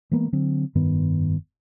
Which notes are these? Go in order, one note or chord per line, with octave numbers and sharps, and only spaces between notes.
E3 G#3 A#3 B3
D3 F#3 C4
F1 G2 D#3 B3